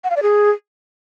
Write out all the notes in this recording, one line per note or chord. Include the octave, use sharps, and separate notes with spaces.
F#5
F5
D5
G#4